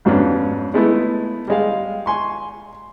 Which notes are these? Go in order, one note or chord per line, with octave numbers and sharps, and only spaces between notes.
F2 G#2 F#3 B3 C#4 D4
G#3 A3 B3 E4
G3 G#3 F5
G#5 C6 C#6